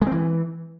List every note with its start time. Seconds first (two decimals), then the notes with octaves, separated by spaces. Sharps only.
0.02 G#3
0.07 C4
0.12 E3